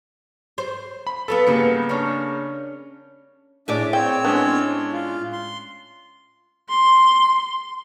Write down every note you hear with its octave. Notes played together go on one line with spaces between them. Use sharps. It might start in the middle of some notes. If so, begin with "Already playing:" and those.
C5
B5
B3 F4 A4 B4
C#3 G3 A#3 B3 F4 C#7
C#4 D4
A2 D4 G#4 D5 E5
C4 C#5 G5 E6
G#3 B3 C#4 D4
F4
C6
C6